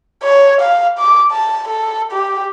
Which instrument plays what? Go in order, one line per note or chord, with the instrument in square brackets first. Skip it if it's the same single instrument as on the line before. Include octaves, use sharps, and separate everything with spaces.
[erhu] C#5
F5
D6
A5
A4
G4